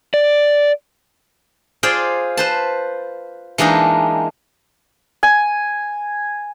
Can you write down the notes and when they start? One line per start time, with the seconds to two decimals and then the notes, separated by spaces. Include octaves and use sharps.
0.14 D5
1.83 F4 G#4 C5 D5 F5 G5
2.37 B4 C5 A5
3.58 E3 G#3 A#3 D4 D#4
5.23 G#5